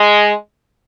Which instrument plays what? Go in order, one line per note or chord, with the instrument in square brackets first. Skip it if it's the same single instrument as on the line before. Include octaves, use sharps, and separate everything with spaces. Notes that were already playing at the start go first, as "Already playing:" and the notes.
Already playing: [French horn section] G#3